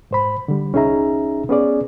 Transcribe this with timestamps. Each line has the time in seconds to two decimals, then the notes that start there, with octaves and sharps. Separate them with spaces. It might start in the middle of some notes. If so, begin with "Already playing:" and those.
0.11 G#2 C5 B5
0.48 D3 G3
0.73 C2 C#4 D#4 G#4 E5 A#5
1.49 B3 C#4 G#4 D5